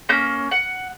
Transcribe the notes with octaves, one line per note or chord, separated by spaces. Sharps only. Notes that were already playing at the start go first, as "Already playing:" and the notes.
A#3 C#4 G6
F#5